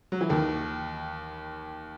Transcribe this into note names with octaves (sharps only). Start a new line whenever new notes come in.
F#3
E3
D#2 D#3